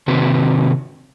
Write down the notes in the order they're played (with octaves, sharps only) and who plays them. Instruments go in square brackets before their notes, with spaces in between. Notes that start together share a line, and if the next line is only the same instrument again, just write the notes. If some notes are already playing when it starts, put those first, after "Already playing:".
[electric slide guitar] C3 D#3 C4 F#4 B4